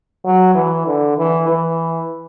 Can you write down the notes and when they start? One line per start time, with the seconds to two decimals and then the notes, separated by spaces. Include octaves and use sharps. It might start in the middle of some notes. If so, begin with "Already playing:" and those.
0.25 F#3
0.55 E3
0.86 D3
1.17 E3
1.48 E3